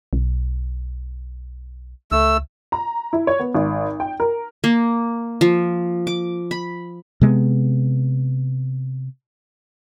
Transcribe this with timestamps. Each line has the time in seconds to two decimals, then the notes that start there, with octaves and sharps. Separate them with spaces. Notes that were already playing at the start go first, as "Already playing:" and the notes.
0.13 B1
2.12 C#2 A3 E6
2.72 A#5
3.13 E4
3.27 C#5
3.40 B3
3.54 G#1
4.00 G5
4.20 A#4
4.64 A#3
5.41 F3
6.07 D6
6.51 B5
7.21 C3 G#3 A3 B3